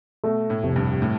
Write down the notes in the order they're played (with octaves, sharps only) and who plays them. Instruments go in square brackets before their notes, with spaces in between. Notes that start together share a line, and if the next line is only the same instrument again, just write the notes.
[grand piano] B2 [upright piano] A3
[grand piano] A2
[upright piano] F1
[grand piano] G2
A2